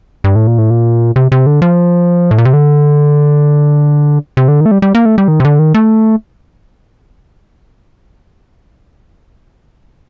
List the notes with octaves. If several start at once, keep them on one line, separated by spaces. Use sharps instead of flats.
G2
A2
A#2
A2
A#2
C3
C3
D3
F3
A2
A#2
C3
D3
C3
D3
D#3
A3
G3
G3
A#3
A3
G3
D#3
C3
D3
D#3
A3